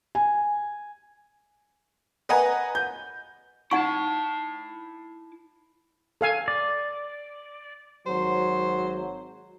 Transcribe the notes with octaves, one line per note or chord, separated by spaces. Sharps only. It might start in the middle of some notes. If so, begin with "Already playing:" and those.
G#5
B4 D#5 F#5 G#5 A#5
G6
D#4 E4 F#5 A5 C#6
A4 F5 G#5
D5
G#1 F#3 C5